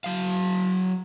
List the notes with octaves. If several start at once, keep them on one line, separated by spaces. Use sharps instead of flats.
F#3 F5